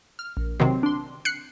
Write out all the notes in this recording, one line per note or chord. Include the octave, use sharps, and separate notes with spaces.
F6
A#1
C3 D#3 F#3 C4
D4 C6
F#6 C7 C#7